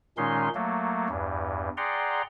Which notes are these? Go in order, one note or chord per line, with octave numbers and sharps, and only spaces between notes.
A#2 D#3 G#3 C#4 D#4 C6
F#3 A3 A#3
E2 G2
G#4 D5 F#5 G5 A#5 C6